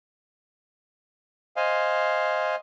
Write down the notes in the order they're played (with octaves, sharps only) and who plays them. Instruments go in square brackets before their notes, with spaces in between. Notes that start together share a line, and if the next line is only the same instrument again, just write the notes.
[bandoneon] C5 D#5 F5 G#5